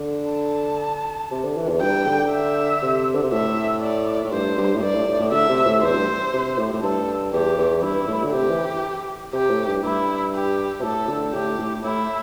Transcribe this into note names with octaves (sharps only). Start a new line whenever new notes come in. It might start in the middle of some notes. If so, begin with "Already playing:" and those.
Already playing: D3
A5
C3
D3
E3
E2
G2 G5
D3
E5
C3
D3
C3
A2 E5
D5
A2
G2 C5
G2
A2
G2 D5
A2
A2
A2
D3 E5
C3
A2
E2 C5
G2
C3
A2
A2
G2 A4
E2 G4
E2
G2 E4
A2
D3
C3 G4
E3
C3 G4
A2
G2
G2 E4
G4
C3
A2 A4
D3
A2 G4
A2
A2 E4